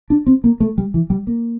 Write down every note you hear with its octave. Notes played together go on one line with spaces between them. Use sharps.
D4
C4
A#3
A3
G3
E3
G3
A#3